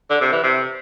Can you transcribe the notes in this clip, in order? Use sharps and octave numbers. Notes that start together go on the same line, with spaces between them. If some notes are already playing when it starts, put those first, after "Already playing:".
D3
C3
E3
C3